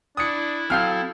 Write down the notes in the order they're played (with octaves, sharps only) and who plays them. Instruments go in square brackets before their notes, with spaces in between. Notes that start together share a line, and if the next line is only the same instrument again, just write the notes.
[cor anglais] D4 [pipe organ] E4 [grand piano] D#6 C#7
[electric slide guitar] F#3 C4 F5 [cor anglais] A4 [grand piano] F6 G6